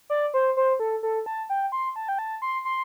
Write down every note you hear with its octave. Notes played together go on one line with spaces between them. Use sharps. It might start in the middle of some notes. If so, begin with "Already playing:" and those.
D5
C5
C5
A4
A4
A5
G5
C6
A5
G5
A5
C6
C6